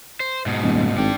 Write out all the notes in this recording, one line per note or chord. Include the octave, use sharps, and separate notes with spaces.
C5
G#2 B2
D#1
G#1 D4 G5